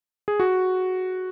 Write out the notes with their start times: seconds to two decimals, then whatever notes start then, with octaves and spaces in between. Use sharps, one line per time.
0.28 G#4
0.40 F#4